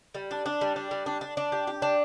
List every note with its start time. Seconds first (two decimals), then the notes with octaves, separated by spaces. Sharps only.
0.14 G3
0.31 D4
0.46 D4
0.61 G3
0.76 D4
0.91 G3
1.06 D4
1.21 D4
1.37 D4
1.52 G4
1.67 G4
1.82 D4